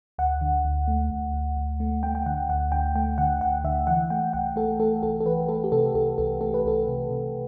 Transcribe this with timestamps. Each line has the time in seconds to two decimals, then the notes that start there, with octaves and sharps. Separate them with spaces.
0.18 D2 F#5
0.41 D3
0.65 D2
0.88 A3
1.10 D2
1.34 D2
1.57 D2
1.80 A3
2.03 A3 G5
2.15 G5
2.26 D3 F#5
2.49 D2 F#5
2.72 D3 G5
2.95 A3 G5
3.18 D3 F#5
3.41 D2 F#5
3.64 D3 E5
3.87 E3 F#5
4.10 A3 G5
4.33 C2 F#5
4.56 A3 A4
4.80 A3 A4
5.03 C2 A4
5.20 A4
5.26 E3 B4
5.49 A3 A4
5.64 G4
5.72 C3 A4
5.94 C2 A4
6.18 C2 A4
6.41 A3 A4
6.54 B4
6.64 C2 A4
6.87 C3
7.10 C3